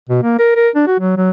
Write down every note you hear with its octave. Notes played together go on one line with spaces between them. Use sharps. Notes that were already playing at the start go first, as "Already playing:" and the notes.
B2
A#3
A#4
A#4
D4
F#4
F#3
F#3